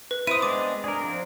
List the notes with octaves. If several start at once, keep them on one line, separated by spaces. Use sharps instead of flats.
B4
C4 E4 D#6 D#7
G#3 B3 D4 D6
D4 G#4 A#4
F3 C4